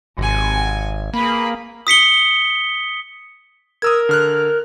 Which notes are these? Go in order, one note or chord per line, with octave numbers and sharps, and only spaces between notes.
G#1 C3 G#5
A#3 G#4 B4 B5
D#6 B6 C#7 G7
A#4 D#6 E6 G#6
D3 F6 F#6